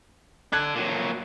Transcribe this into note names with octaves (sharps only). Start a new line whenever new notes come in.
D4 A4 F#6 G#6
A#2 F#3